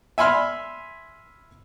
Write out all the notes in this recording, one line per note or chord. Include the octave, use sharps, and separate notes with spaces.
E5 G#5 B5 C6 F6